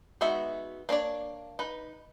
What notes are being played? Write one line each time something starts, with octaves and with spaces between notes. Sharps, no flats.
G#3 B3 D#4 F#4 E5
A#3 D4 C#5 D5
D#4 B4